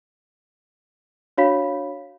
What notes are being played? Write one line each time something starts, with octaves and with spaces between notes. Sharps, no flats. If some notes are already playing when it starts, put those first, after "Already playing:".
D4 F#4 C#5 F5 B5 B6